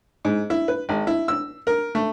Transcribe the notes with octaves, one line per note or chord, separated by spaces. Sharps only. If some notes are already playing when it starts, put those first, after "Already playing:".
G#2
E4
B4
G#1
E4
E6
A#4
A3